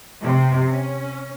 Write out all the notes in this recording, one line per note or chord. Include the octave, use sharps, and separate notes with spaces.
C3
C#4